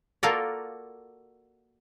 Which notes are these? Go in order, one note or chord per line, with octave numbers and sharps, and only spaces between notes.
A#3 F4 F#4 A4 A#4 D5